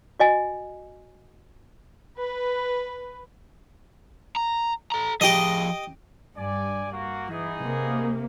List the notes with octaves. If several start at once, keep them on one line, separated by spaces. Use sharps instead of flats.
F#4 D#5 G#5
B4
A#5
A4 A#5
F3 G4 G#4 D#5
G2 D5 G#5
A#3 F#4
E3 B3 D#4 G#4
C3 A#3